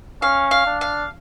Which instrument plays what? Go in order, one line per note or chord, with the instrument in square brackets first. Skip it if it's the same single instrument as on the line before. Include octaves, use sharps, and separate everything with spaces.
[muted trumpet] C#4 [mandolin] F5
[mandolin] F5
[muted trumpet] D4
[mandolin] F5